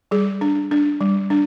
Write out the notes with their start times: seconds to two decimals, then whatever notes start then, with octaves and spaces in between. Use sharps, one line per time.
0.11 G3 G#4
0.41 D4
0.71 D4
1.01 G3
1.30 D4